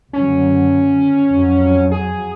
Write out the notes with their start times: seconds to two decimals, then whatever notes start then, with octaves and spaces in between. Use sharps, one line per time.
0.13 F#1 D3 F#3 C#4
1.30 F2 F#3
1.91 G#4